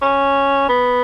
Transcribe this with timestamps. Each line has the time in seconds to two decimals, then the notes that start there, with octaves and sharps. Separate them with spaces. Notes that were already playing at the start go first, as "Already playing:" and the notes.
0.02 C#4
0.69 B3